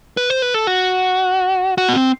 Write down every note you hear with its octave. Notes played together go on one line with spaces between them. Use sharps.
B4
C5
B4
A4
F#4
F#4
B3
C4